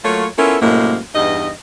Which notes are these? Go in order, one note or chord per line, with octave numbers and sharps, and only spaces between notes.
F#3 A3 A#3 F4 C#5
B3 C#4 E4 F4 A4 A#4
F#2 A2 C3 G#3 A#3
E2 G2 D#4 D#5